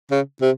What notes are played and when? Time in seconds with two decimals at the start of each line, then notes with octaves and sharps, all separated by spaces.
0.11 C#3
0.41 C3